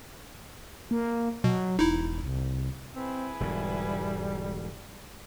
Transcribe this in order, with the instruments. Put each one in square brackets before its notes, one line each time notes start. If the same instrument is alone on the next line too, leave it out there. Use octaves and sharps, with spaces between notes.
[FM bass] A#3
[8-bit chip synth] B2 [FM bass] F#3
[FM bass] E1 [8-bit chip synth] D#4 E4
[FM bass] C2
[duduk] C4 [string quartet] E4 G#4 B4
[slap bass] E1 G#2 D3 [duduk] G3